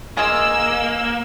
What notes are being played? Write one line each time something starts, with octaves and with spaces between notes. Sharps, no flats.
G#3 A#3 F4 G#4 E6